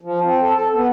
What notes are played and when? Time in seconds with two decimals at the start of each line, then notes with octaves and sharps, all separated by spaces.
0.01 F3
0.24 C4
0.41 A4
0.54 A4
0.74 B3